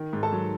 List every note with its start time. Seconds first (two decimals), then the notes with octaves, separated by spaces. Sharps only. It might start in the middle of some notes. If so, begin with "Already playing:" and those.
Already playing: D#3
0.13 G#2
0.23 A4 A5
0.32 F#3